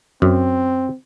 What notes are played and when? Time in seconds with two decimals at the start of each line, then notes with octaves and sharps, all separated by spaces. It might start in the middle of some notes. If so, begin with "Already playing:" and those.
0.22 F#2 C4